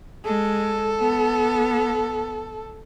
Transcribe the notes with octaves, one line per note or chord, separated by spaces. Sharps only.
G#3 A4
B3